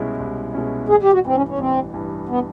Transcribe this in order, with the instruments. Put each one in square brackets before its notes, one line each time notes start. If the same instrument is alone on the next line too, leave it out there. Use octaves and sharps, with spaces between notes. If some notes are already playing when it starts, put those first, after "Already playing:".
Already playing: [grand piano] C2 B2 G#3 C#4 E4
C2
B2 G#3 C#4 E4
[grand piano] A1 [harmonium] G#4
[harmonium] G4
F#4
[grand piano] G2 E3 [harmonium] C4
[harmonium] C#4
C#4
[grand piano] A1 [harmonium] C4
[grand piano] G2 E3
[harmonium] B3